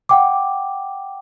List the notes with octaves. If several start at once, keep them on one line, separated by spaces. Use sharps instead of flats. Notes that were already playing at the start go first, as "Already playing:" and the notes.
F#5 G5 D6